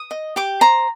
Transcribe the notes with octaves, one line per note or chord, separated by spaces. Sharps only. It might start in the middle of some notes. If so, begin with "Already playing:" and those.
Already playing: D#6
D#5
G4 D6
C5 A#5